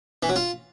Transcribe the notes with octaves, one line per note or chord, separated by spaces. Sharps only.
E3
F#3
F4